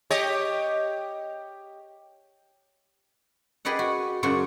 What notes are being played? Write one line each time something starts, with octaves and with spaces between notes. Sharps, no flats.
G4 C#5 D#5
G4 G#4 B4 D5 D#5 F#5
F#4
F#2 C#3 F#3 D4 F#4 C5